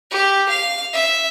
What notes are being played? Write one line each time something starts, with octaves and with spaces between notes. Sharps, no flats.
G4
F5
E5